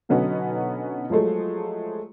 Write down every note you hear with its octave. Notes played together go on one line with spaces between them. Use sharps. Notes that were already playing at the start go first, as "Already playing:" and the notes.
B2 D3 F#3 B3 C#4 D#4
F3 F#3 G#3 A3